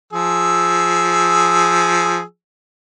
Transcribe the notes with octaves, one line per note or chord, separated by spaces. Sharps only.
F3 G#4 E6